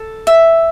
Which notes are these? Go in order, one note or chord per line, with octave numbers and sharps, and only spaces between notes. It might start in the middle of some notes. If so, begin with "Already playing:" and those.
Already playing: A4
E5